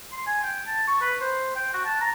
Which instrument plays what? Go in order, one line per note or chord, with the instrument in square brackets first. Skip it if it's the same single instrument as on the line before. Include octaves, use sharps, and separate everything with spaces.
[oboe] C6
G#5
G5
A5
C#6
B4
C5
G5
F#4
A5
A#5